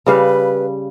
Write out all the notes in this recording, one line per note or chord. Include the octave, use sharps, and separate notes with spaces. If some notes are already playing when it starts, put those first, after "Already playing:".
C#3 G3 B4 F5